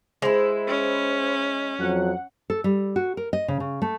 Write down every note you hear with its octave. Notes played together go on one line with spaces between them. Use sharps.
G#3 E4 C5
C#4
F2 F#3 F#5
A4
G3
F#4
A#4
D#5
C#3
C#3
A3